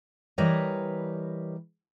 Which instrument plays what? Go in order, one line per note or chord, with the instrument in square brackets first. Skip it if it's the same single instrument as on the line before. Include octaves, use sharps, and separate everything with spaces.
[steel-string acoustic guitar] E3 G3 A#4 B4 C#5 D#5